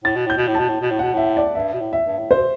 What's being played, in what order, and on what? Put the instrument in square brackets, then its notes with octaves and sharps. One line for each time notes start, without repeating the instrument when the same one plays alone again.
[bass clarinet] A2 [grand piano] A6
[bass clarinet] B2
[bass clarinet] A2 [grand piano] G6
[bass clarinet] B2
A2
[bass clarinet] B2 [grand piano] A5
[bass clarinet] A2
B2
A2
[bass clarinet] B2 [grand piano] F#5
[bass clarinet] A2 [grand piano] E5
[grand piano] D5
[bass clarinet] G2 [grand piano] E5
[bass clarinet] B2
A2
[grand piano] E5
[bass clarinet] G2
A2
[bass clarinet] B2 [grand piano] C5